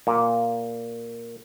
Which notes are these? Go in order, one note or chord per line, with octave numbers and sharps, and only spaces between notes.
A#2